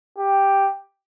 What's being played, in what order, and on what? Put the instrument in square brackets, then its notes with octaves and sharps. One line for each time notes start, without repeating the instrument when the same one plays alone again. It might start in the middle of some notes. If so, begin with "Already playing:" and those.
[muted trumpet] G4